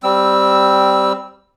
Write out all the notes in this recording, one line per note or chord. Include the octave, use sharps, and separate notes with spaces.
G3 C4 E6